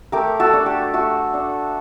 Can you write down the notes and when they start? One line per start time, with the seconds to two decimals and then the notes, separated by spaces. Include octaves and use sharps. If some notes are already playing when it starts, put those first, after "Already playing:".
0.12 A3 G4 A#4
0.40 F#4 A4
0.53 D4
0.66 G4
0.94 A3 F#4
1.34 D4